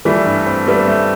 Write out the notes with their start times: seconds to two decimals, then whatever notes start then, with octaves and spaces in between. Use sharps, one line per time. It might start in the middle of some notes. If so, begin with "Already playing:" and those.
0.05 E3 G3 A3
0.26 G2
0.46 C4
0.67 G3 A3 B3
0.88 A3